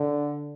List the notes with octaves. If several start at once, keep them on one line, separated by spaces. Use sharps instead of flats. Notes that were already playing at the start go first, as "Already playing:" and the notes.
Already playing: D3